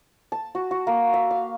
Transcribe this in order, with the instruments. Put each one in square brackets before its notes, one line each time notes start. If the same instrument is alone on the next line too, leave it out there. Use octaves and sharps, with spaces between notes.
[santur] A5
F#4
F#4
A#3
E5
F5